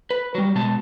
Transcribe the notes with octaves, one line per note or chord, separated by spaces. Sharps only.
B4
F#3 G3
B2 G#3 A5